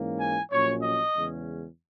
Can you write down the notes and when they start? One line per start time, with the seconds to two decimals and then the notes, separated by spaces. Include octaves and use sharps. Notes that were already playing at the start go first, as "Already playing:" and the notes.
Already playing: G#2 E3 A#3 C#4
0.20 G#5
0.51 A#1 A#2 F#3 C#4 C#5
0.83 D#5
1.15 E2 C#3 G#3 C#4